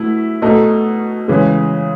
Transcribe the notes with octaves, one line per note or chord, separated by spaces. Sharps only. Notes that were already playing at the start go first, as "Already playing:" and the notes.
Already playing: B2 A3 E4
B2 A3 D#4 A4
C#3 E3 G#3